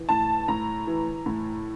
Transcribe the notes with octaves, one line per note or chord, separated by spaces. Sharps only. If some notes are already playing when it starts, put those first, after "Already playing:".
Already playing: E3
A2 A5
A2 A#5
E3
A2